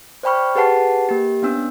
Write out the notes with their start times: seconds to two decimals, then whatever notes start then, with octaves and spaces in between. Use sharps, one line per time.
0.23 C5 D5 G5 B5 C#6 F6
0.55 G4 G#4 B4 F#5 A5 C7
1.09 A#3 G4
1.43 B3 C#4 D4 E6